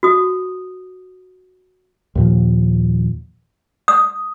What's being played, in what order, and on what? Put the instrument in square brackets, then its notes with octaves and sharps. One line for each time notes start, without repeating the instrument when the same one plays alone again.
[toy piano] F#4 D#6
[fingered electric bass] D#2 A#2 F3
[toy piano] D#6